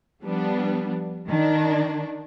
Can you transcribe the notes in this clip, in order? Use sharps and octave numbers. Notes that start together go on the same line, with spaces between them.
F3 G3 B3 D4
D#3 D4